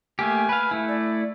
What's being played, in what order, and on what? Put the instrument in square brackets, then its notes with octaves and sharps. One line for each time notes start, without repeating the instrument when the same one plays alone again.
[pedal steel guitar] A3 A#3 G4 [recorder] G#5
[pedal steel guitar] B4 F5
A3 E4
[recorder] D5